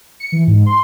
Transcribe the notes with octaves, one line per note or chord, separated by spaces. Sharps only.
C#7
E3
G#2
C6